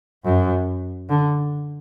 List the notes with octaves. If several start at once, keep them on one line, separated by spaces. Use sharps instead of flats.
F#2
D3